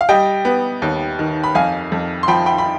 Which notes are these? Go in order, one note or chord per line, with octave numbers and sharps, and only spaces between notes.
F5
G3 D#5 G5
B3
D#2
D#3
B5
F2 F5 G#5
F2
C6
F3 G5 B5
G5 B5
B5